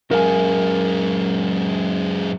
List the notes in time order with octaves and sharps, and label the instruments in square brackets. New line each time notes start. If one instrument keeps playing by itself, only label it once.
[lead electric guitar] F#2 G#3 [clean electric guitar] A#4 F5 G#5